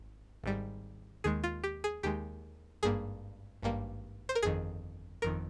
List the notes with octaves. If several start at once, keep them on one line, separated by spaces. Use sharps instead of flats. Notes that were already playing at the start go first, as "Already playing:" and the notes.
Already playing: G#1
G#1 G#2 G3
D#2 D#3 G#3 G#4
F4
G4
G#4
D#2 D#3 G#3 G4
G#1 G2 G3 A#3 G#4
G#1 G2 G3 A#3
C5
A#4
G1 F2 D#3 G#4
G1 F2 D#3 A#4